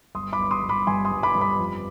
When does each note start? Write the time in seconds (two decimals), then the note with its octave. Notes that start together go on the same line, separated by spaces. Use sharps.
0.15 G1 C6 D#6
0.33 B5 D6
0.39 G1
0.51 C6 D#6
0.63 G1
0.69 B5 D6
0.87 G2 G#5 C6
1.05 C6 D#6
1.11 G1
1.23 B5 D6
1.35 G2
1.41 B5 D6
1.59 F2